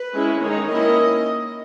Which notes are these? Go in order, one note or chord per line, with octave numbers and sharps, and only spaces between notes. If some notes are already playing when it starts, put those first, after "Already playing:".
Already playing: B4
G#3 C#4 E4
D#3 G#3 D#4 C#5
D#3 A#3 C#4 E4 D#5